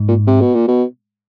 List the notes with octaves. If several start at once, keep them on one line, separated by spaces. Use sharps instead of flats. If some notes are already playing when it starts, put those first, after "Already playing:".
Already playing: G#2
A#2
C3
B2
A#2
B2